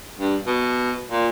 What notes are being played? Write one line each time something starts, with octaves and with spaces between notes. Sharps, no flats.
G2
B2
A#2